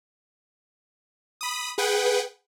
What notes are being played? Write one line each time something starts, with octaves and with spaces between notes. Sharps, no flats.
B5 D#6
G#4 B4 F#5 G5